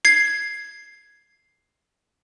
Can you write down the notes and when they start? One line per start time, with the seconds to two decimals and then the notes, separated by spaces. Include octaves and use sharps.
0.05 G#6 C7